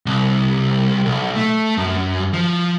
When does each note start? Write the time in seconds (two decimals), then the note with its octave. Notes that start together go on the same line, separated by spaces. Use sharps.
0.06 C2
1.05 B1
1.36 A3
1.78 F#2
2.34 F3